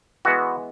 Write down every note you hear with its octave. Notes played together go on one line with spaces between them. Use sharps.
E3 G#3 B3 F#4